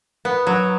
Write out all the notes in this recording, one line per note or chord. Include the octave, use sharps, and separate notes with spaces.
B3
F#3